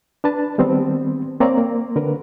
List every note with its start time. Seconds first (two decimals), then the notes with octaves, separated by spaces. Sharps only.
0.24 D4 B4 A5
0.58 D#3 G3 B3 C4
1.40 A#3 C4 C#5 D5 A#5
1.57 A#3
1.96 D3 A#4 B4